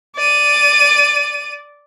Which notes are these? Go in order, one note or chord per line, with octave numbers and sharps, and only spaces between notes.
D5 D#7